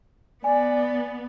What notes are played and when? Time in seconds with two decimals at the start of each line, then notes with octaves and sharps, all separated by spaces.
0.44 B3 D5 G#5